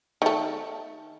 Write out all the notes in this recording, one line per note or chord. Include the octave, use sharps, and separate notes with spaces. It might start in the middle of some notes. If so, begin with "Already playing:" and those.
D#3 A3